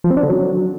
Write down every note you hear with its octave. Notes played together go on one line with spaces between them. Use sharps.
F3
C4
D4
D3
F#3